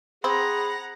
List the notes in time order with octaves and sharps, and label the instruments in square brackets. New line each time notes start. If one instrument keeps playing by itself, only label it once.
[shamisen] C4 [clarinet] G#4 [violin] F#5 A#5 [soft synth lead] B5